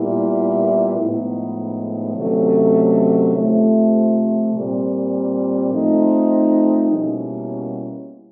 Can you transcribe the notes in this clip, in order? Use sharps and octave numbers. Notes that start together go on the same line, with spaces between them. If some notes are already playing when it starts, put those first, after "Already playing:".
Already playing: A#2 G3 B3 E4
A2 F3 G#3 B3 D#4
C3 D#3 F#3 A3 C#4
C3 F3 A3
A#2 G3 C4
F3 A3 C4 D#4
B2 G3 A#3 C#4 E4